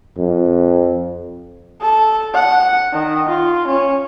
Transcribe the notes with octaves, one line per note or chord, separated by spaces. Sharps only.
F2
A4
F#5
D#3
F4
C#4